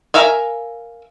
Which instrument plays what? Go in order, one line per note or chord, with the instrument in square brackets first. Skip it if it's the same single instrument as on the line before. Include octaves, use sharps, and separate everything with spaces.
[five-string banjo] A#4 E5 F5 G#5